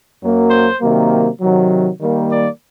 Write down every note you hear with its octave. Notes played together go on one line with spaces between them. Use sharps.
F#2 F#3 A#3
C5
C3 D#3 F#3 A#3
C3 D#3 F#3
D#3 G3 A#3
D5